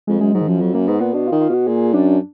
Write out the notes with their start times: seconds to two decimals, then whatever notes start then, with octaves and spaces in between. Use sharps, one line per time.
0.07 F2 G#3
0.21 F#2 G#3
0.34 G#2 F#3
0.41 D#3
0.48 F#2 F3
0.61 F2 F#3
0.74 F#2 A#3
0.87 G#2 B3
1.00 A#2 B3
1.14 B2 D4
1.27 F4
1.32 D#3
1.41 F4
1.49 B2 F#4
1.67 A#2 G#4
1.94 F#2 D4